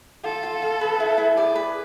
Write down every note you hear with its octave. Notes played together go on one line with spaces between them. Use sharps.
F4 A4
F4
F5
B4
E4
E4
G#4 D5
B4